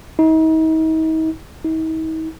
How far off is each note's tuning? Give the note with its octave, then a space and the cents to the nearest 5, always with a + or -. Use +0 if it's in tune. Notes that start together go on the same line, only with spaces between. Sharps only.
D#4 +40
D#4 +45